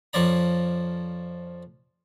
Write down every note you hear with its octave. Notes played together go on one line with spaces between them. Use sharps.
F2 F3 C#4 D5 A#5